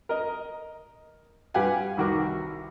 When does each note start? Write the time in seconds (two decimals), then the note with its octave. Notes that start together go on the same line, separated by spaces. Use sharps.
0.09 A#4 D#5
1.54 G2 G4 B4 F5 F#5 G#5
1.97 C2 D#3 F#4 A#4 D6